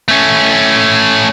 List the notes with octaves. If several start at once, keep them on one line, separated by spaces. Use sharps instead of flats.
A3 C#4